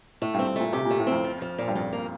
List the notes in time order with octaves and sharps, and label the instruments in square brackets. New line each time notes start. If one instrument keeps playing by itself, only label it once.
[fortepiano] A2 [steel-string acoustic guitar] A3
[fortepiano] G2
[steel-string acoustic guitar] C4
[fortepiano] G2
[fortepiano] A#2 [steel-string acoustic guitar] A3
[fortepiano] C3 [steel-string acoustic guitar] G4
[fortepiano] A#2
[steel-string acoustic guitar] A3
[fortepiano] A2
[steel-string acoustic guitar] C4
[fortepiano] F2
[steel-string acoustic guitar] F3
F3
A#2
[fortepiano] G2
[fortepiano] F2 [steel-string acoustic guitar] A#2
[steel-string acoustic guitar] A#3